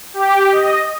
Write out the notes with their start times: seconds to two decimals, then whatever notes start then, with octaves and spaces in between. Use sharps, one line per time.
0.13 G4
0.52 D#5